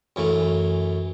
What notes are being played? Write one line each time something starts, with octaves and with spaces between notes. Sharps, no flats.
F#2 E3 A3